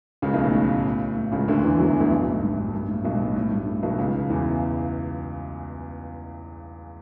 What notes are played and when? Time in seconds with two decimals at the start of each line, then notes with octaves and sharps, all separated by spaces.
0.22 C#2 C#3
0.34 B1 B2
0.44 A2
0.54 A2
1.17 A2
1.32 C#2 C#3
1.48 D2 D3
1.64 E2 E3
1.79 F#2 F#3
1.90 E2 E3
1.99 D2 D3
2.11 B1 B2
2.27 A2
2.42 G2
2.57 G2
2.73 G2
2.88 A2
3.04 B1 B2
3.15 G2
3.25 A2
3.36 A2
3.51 G2
3.67 A2
3.83 B1 B2
3.98 C#2 C#3
4.30 E2 E3